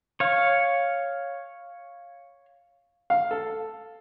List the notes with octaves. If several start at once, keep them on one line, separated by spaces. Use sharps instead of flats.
C#5 F5
F5
A4